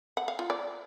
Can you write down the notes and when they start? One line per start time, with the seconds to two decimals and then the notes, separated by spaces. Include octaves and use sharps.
0.17 F#5
0.28 F5
0.39 F4
0.50 D5